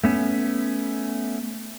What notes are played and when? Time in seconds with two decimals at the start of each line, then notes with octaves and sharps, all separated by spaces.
0.04 A3 B3 C#4